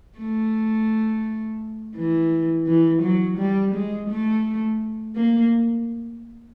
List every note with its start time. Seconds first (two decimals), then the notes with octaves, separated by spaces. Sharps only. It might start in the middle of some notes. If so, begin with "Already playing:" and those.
0.19 A3
1.97 E3
2.67 E3
3.02 F#3
3.38 G3
3.74 G#3
4.09 A3
5.16 A#3